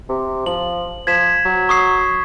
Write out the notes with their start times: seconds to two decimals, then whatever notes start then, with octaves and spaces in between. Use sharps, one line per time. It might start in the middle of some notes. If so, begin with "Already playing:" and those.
0.09 C3
0.46 F3 F#7
1.07 F3 G#6 B6 E7
1.45 F#3
1.69 C#6 D#6 C7